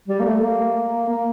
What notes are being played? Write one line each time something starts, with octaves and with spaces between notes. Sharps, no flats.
G3
A#3
A3
A#3
A#3